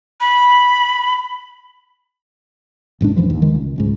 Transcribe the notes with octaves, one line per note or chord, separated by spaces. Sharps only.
B5
A1 A2 G#3 D4
E1 F#2 E3 F3
D#2
D#3 G#3
C#2
D1 C#2 G#2